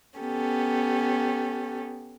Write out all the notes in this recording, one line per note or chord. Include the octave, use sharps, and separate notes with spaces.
B3 C#4 G4 A4